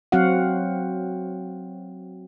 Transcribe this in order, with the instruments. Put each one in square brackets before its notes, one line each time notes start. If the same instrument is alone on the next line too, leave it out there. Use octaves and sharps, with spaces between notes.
[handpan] F#3 C4 F#4 F5 F#5